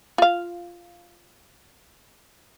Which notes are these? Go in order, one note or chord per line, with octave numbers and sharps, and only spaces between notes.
F4 F5